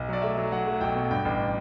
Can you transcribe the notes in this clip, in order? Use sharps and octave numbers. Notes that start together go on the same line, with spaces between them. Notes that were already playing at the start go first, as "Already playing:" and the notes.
Already playing: B1
F#3 D5
A3 E5
F#3
F#3 F#5
A3
B1 G5
B2
G2 G5
A1